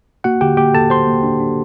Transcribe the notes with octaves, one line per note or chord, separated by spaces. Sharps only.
A#3 F#4 F#5
D3 G4 G5
A#3 G4 G5
A#3 A4 A5
A#3 C5 C6
A#3
D4
D4